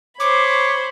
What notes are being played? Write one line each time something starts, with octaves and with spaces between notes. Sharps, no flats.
C5 C#5 B5 D6